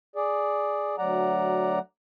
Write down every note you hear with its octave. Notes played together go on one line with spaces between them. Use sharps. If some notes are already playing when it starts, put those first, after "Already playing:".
G#4 D5
D2 F#3 D5 F#5 A#5